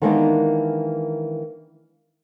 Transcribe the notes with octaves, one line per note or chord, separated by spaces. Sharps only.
D#3 E3 G#3 A#3 B3 D4